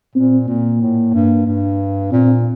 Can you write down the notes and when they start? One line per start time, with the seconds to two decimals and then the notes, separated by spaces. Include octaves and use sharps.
0.15 A#2 C4
0.47 A#2 A#3
0.81 A2
1.14 G2
1.46 G2
2.12 A#2 C4